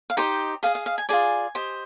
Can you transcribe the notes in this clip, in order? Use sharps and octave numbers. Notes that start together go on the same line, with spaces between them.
F5
D#4 G4 C5 D#5 G5
G#4 D#5 F5
F5
F5
G#5
F4 G#4 D5 G#5
G4 C5 D#5